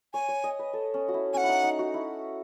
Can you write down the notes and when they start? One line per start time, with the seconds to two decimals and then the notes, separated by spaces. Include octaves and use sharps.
0.14 C#5 G#5
0.29 C#5
0.44 D#5
0.59 B4
0.73 A4
0.94 C#4
1.08 F#4
1.14 E4
1.33 C#4 F#5 G#5
1.43 E4
1.49 D#4
1.64 D#4
1.79 F#4
1.94 E4